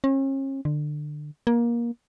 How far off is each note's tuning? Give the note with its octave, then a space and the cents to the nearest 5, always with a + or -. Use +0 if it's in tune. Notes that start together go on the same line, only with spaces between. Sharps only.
C#4 -40
D3 +25
A#3 +20